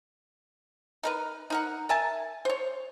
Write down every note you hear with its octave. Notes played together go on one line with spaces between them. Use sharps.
D#4 A#4 B4
D#4 A#4 F#5
A#4 E5 G#5 A5
C5 C#5